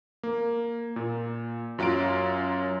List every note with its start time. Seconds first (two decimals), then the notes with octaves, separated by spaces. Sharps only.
0.23 A#3
0.96 A#2
1.79 F#2 F#3 F4 F5 D7